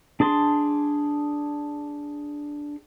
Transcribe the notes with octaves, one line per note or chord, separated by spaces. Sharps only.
D4 G#4 A5 C6